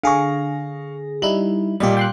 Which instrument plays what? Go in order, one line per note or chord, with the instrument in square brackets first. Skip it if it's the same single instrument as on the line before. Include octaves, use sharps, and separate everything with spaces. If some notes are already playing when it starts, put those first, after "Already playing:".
[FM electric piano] D3 G#4 A#6 [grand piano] F5 C#6
[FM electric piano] G3 D#4 E4 [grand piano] F#7
[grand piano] A#2 G3 [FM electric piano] G4 D#5
[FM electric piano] G5 C6 F#6